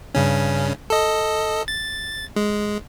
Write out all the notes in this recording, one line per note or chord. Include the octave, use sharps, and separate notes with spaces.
G2 C#3 C#4
A4 D#5
A6
G#3